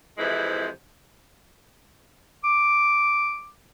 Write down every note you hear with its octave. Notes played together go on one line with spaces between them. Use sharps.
F2 C3 E3 G#3 E4
D6